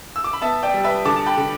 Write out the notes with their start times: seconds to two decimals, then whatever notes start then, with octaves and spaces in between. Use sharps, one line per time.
0.16 E6
0.24 D6
0.33 B5
0.42 B3 E5 A5
0.63 D5 G5
0.74 G3
0.84 B4 E5
1.05 D3 A5 D6
1.16 A5
1.26 G5 B5
1.37 D3